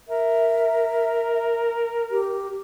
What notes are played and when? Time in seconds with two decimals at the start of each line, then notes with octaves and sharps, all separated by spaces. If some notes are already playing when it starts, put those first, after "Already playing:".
0.09 A#4 E5
2.11 G4